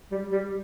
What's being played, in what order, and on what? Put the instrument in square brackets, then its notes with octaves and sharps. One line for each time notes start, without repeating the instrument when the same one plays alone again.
[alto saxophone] G3
G3